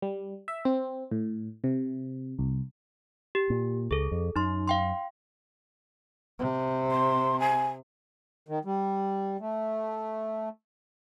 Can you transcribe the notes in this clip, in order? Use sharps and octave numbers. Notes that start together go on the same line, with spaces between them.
G3
E5
C4
A2
C3
C2
G4
A#2
C#2 G#4 A4
F2
F#2 D#4 C6
F5 G5 C6
C3
C6
G#5
D#3
G3
A3